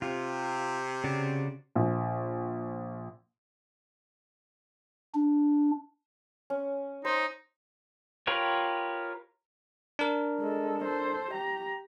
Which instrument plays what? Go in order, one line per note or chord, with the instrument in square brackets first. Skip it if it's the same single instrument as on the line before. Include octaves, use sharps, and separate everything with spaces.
[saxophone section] C3 [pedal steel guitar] F4
[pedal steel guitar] C#3 F#4 D5
[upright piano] A#1
[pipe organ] D4
[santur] C#4
[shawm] D#4 [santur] C5
[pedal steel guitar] F4 G4 A#4 B4 C#5
[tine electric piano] D4 A#4
[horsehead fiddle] G#3 A4
A4 C5
G4 A#5